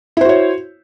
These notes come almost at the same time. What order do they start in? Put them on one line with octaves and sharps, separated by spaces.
E4 C5 F#4 C#5